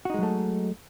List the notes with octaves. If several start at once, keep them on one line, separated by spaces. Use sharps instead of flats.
F#3 G#3 A3 D#4 F#4